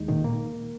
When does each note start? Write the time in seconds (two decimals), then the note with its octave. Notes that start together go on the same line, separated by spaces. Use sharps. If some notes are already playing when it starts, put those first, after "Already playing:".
Already playing: D#2 G#3 D#4
0.08 A#2 D#3
0.24 A#3